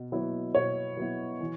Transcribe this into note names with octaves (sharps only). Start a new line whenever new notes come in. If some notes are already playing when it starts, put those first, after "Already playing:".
Already playing: B2
F#3 B3 E4
B2 C#5
F#3 B3 E4
E3